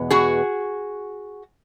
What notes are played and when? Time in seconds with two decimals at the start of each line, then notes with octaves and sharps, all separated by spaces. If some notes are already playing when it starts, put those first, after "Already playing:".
Already playing: E2 B2 G#3 B3
0.11 F#4 G#4